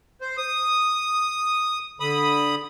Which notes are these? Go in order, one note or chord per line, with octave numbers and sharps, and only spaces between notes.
C5
D#6
D3 B5 D#6